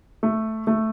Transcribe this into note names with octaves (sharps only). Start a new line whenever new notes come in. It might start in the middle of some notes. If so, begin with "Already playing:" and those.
A3
A3